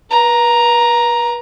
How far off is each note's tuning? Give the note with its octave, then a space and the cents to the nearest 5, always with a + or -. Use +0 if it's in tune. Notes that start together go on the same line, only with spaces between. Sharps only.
B4 -35 A#5 +5